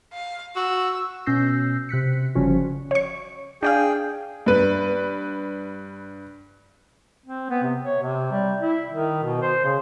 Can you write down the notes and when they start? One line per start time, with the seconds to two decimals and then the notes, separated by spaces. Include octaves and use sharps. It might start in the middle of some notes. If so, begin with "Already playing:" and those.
0.13 F5
0.56 F#4 E6
1.26 B2 C#4 E6 G6 A#6 C7
1.89 C3 F#6 B6 C#7
2.35 G1 C#3 F3 G3 C#4 F#4
2.91 C#5 C#6
3.63 D4 G#4 D5 F5 G5
4.46 G2 B4
7.26 C4
7.50 B3
7.63 C3
7.83 C#5
8.01 C3
8.32 G3
8.60 E4
8.90 D#3
9.22 B2
9.42 C5
9.64 C#3